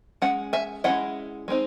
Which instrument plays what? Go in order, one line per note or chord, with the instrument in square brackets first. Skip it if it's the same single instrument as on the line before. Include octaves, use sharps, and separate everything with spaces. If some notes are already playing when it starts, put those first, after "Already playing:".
[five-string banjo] G#3 C#4 F#5
E5 G#5
G#3 C#4 E4 D#5 F#5
G#3 C4 D#4